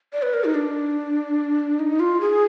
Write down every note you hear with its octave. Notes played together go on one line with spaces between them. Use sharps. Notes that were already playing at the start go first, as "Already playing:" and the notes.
D5
B4
A#4
D#4
D4
D#4
F4
G#4